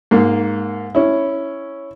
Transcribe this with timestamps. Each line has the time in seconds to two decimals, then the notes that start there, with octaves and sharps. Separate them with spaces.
0.11 G#2 A#3
0.95 C#4 E4